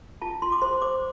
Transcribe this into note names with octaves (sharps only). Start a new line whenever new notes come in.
F4 A5
F4 C6
D6
C5 C6
C5 D6